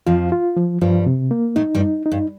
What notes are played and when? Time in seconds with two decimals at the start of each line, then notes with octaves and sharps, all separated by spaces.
0.06 F2 F3 F4
0.32 F4
0.57 F3
0.81 G2 F3 G3
1.06 C3
1.31 A#3
1.56 A2 A3 D#4
1.75 G2 G3
1.81 D#4
2.06 D#4
2.12 G2